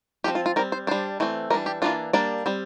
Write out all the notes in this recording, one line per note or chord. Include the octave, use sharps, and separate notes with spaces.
F3 C4 G4
F4
F4
G3 C4 A#4
C5
G3 D4 C5
E3 A3 C4
E3 G3 D4 A#4
G4
E3 A#3 D4 F4
G3 A#3 D4 D5
G3 C4